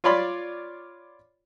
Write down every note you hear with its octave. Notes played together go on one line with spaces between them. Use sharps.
F4 C#5 D5 B5 C6